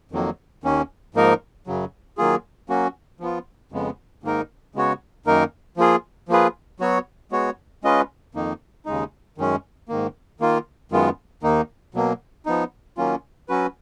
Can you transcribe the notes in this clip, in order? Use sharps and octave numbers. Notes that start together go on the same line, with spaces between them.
F2 D#3 F#3 A#3
D#2 D#3 A#3 C#4
G#2 F3 A#3 D#4 A#4
F#2 C#3 F#3
D#3 F#3 A#3 F4 G#4
F#3 A#3 C#4 F#4
F3 B3 F4
F2 C#3 G#3 B3
G#2 D#3 A#3 D#4 A#4
C#3 G#3 B3 F#4 C#5
F#2 D#3 A#3 D#4 A#4
F3 A#3 F4 G#4
F3 A#3 F4 G#4 B4
F#3 B3 F#4 C#5
G#3 B3 F#4 C#5
G#3 C#4 F4 B4 D#5
F2 D#3 A#3 D#4
D#2 C#3 G#3 D#4
F#2 D#3 G#3 C#4
G#2 D#3 A#3
D#3 A#3 F4
F#2 D#3 G#3 B3 F4
D#2 D#3 A#3 D#4
B2 F#3 A#3
F3 B3 D#4
D#3 F#3 A#3 C#4 F4
F#3 C#4 F#4 B4